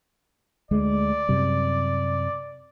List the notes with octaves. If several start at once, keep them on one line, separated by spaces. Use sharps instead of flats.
D2 G#3 D5
F#2 C3 G3